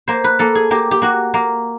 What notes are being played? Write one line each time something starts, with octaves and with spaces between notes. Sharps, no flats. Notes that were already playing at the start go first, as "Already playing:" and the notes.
A#3 C5
B4
A#3 A4
G#4
A#3 G4
G4
A#3 F#4
A#3